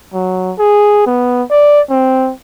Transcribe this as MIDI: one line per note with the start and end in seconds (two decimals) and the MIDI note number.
0.14 0.53 54
0.58 1.02 68
1.07 1.43 59
1.50 1.80 74
1.90 2.32 60